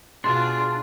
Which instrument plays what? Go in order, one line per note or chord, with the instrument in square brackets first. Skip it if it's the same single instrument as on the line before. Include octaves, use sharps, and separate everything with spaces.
[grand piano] B2 [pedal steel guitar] D4 [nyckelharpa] F4 G#4 [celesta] C6